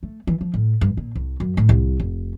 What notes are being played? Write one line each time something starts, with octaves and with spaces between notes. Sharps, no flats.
A3
E3
F3
A2
G2
A#2
C2
F#2
A2
C2
F1